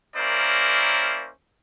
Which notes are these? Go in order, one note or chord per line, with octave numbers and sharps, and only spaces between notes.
A#3 C#4 E4 A#4 C5 D5